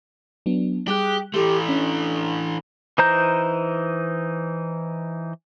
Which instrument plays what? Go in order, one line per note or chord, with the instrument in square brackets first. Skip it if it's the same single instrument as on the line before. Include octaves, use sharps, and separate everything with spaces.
[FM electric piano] F#3 B3 D4
[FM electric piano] G3 F#6 [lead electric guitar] G4 [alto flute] G#4
[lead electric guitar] E3 A3 [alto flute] G4 [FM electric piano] A4 C6
[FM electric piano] C#4 [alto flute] D4
[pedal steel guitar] E3 D#4 C5 A#5 G6